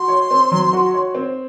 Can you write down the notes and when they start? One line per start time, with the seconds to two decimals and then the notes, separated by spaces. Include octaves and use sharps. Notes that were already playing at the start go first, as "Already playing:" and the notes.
Already playing: F#4 C6
0.08 C#5
0.31 C4
0.52 F#3
0.73 F#4
0.94 C#5
1.15 C4